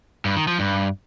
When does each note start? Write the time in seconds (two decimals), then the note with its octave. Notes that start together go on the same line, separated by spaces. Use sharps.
0.25 G2
0.36 D#3
0.48 F3
0.59 G2